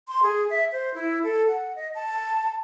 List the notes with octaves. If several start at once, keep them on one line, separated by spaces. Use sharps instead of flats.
C6
G#4
E5
C5
E4
A4
F#5
D#5
A5